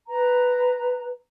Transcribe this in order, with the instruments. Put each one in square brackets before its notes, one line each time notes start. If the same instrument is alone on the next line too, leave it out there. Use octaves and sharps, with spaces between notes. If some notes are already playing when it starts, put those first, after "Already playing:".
[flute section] B4 A#5